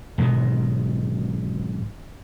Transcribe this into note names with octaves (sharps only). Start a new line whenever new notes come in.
B1 G#2 B2 D#3